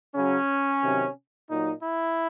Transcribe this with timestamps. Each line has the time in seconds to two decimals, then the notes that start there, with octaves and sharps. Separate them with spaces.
0.15 C#3 F#3 C#4
0.82 C3 D#3 F#3
1.49 A#2 F#3 D#4
1.83 E4